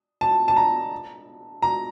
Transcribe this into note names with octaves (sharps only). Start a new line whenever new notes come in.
A5
A5
A#5
A#5